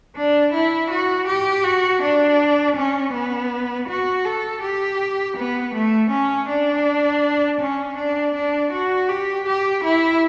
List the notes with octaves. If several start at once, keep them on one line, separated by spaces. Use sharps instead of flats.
D4
E4
F#4
G4
F#4
D4
C#4
B3
F#4
A4
G4
B3
A3
C#4
D4
C#4
D4
D4
F#4
G4
G4
E4